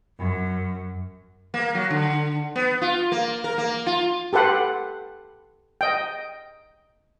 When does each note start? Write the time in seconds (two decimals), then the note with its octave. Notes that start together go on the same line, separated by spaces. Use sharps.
0.18 F#2
1.54 A#3
1.75 F#3
1.90 D3
2.56 B3
2.81 F4
3.12 A#3
3.44 A#4
3.58 A#3
3.86 F4
4.33 G4 A4 B4 F#5 C6
5.81 D#5 G5